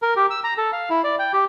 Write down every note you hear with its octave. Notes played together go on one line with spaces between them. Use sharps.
A#4
G4
E6
A#5
A4
F5
E4
D5
G5
G4